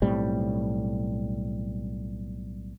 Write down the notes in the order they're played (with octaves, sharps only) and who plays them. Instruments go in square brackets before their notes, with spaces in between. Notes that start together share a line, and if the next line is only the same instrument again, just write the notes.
[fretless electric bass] B1 A2 G3 C4